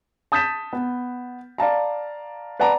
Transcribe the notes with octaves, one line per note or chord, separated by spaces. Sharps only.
A5 D#6 G6 A6 B6 E7
B3
D5 F5 A5 A#5
B4 D5 F#5 A5 A#5